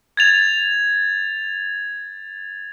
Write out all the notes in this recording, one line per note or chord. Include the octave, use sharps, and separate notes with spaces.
G#6 A6 F7